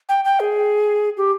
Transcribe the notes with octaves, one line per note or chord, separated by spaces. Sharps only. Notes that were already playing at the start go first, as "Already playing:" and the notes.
G5
G5
G#4
G4